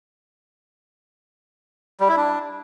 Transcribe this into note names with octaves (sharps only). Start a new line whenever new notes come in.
G3
E4
D4